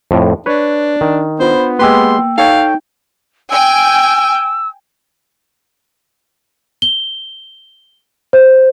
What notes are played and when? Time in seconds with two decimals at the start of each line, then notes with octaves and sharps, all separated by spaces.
0.11 F2 A2
0.46 D4 B4 C#5
1.01 D#3
1.40 B3 D4 F4 C5 B5
1.79 G#3 A#3 G4 B4 G5 C6 E6
2.38 D#4 A4 C#5 F5 G5
3.51 G5 G#5 E6
6.82 G7
8.33 C5